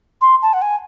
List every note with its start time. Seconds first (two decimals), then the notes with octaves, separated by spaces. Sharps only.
0.21 C6
0.42 A5
0.53 F#5
0.62 G#5